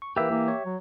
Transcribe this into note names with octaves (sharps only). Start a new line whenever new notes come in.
C#6
E3 A#3 G4 B4 E5
E3 A#3
C#5
F#3